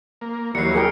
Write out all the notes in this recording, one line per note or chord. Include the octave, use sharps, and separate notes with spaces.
A#3
D#2 E3 F#3 G3 A#3 C7 C#7
G#4 A#4 G5